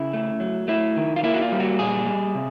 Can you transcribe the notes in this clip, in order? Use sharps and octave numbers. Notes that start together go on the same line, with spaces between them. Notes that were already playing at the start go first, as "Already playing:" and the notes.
Already playing: C#3 E4
A3
F#3
A3 E4
D#3
F4
A#3 E4
F#4
F4
G3
F#4
A#2 G#4
G3
C3